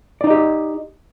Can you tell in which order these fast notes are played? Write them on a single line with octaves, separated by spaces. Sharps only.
D5 D#4 D#5 G4